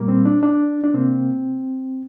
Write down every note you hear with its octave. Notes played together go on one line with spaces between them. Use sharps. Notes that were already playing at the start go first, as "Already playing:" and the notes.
Already playing: A#2 G3 A#3
C4
D4
D4
D4
C3 A#3 C4